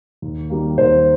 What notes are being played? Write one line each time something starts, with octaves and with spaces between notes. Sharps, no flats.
D#2
D#3 G3 A#3
D#2 C5